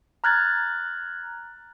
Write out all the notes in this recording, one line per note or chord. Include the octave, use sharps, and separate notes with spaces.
A#5 F6 F#6 G#6 A6